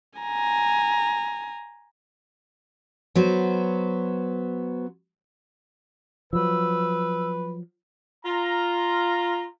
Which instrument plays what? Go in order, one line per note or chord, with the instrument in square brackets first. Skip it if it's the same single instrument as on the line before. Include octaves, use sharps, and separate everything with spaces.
[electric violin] G#5 A#5
[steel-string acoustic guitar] F#3 B3 C5
[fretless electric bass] F3 F#3 [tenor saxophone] B4 [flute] E6
[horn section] F4 A#5